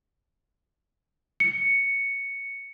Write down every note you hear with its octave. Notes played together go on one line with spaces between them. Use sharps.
C#7